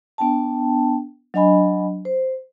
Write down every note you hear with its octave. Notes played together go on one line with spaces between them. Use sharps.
B3 D4 G5 A5
F#3 D4 D#5 G#5 B5
C5